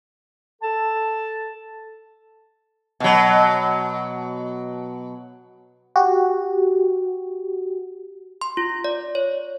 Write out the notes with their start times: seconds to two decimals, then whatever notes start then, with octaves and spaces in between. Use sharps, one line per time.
0.62 A4 A5
3.00 B2 F#3
5.96 F#4 G4
8.41 C6
8.57 F4
8.84 D5
9.15 C#5